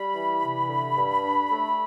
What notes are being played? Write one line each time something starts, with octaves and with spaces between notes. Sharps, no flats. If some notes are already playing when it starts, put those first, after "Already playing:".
Already playing: G3 B5
E3
C3
D3
G2
D4
A3